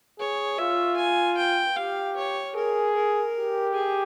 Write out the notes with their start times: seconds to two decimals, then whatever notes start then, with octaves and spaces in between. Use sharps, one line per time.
0.19 G#4 C#5
0.58 F4 E5
0.97 G#5
1.37 G5
1.76 G4 F5
2.17 C#5
2.55 G#4 A#4
2.95 A#4
3.35 G4
3.74 G#4